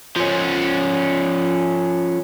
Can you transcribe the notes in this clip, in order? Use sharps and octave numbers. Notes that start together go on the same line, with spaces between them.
F3 C#4